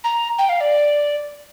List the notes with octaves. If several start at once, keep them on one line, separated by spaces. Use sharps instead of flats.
A#5
G5
F5
D5